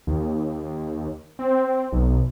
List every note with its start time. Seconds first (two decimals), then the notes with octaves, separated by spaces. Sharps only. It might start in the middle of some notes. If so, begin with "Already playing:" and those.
0.07 D#2
1.39 C4
1.92 B1